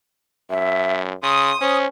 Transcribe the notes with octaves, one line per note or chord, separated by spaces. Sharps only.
F#2 E5
C#3 C6 D#6
C#4 C5